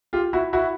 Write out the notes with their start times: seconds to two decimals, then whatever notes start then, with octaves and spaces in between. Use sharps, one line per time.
0.13 F4 G4
0.33 E4 F#4
0.53 E4 F#4